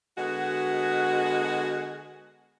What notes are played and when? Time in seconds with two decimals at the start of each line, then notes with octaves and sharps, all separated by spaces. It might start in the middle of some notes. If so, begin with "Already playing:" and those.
0.17 D3 G#3 B3 F#4